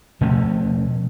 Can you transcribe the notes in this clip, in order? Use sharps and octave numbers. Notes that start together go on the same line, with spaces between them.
B2 F3 A3 C#4